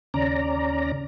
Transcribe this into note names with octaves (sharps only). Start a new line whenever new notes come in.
D#2 C#3 C#4 D5 A#5